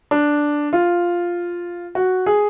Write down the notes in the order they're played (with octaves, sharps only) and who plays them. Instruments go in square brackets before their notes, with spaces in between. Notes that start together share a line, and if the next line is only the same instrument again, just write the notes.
[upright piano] D4
F4
F#4
G#4